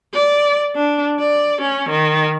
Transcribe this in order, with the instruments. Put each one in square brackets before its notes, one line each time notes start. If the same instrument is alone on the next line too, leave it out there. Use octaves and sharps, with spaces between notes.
[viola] D5
D4
D5
C#4
D#3